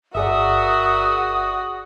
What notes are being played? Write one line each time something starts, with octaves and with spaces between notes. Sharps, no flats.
G1 F#4 G#4 A#4 D5 E5 F#5 D#6